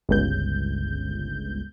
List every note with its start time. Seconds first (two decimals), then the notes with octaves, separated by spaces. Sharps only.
0.09 G1 C#2 G6